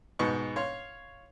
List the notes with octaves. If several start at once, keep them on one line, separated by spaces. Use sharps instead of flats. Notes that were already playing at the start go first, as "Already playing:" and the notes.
G#2 B2 C#6
C#5 F5 C6